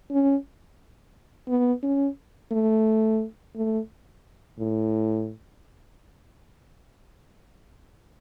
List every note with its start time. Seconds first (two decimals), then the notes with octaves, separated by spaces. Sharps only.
0.11 C#4
1.48 B3
1.83 C#4
2.52 A3
3.55 A3
4.59 A2